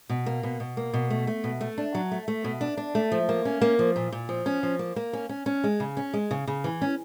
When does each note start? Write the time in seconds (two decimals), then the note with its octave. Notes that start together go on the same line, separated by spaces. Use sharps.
0.10 B2
0.26 A#3
0.43 B2
0.60 B2
0.77 A#3
0.93 B2
1.10 A3
1.27 A3
1.44 B2
1.61 A3
1.78 D4
1.95 F#3
2.11 A3
2.28 A3
2.44 B2
2.61 D4
2.77 D4
2.95 A3
3.12 F3
3.29 A#3
3.45 C#4
3.61 A#3
3.79 F3
3.96 A#2
4.12 A#2
4.29 F3
4.46 C#4
4.63 F3
4.79 A#3
4.96 A#3
5.13 C#4
5.29 C#4
5.46 C#4
5.64 G#3
5.80 C#3
5.97 C#4
6.14 G#3
6.31 C#3
6.47 C#3
6.64 E3
6.81 C#4